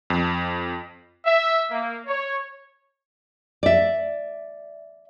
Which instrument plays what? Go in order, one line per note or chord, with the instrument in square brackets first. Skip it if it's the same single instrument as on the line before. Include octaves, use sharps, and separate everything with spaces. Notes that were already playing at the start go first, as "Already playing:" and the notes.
[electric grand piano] F2
[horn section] E5
A#3
C#5
[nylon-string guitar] D5 E5